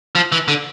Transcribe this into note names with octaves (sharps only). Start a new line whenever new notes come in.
F3
E3
D3